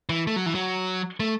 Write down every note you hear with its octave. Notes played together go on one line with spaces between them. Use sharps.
E3
A3
F#3
E3
F#3
A3